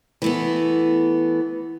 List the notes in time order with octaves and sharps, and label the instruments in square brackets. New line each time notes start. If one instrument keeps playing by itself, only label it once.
[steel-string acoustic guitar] E3 A3 B3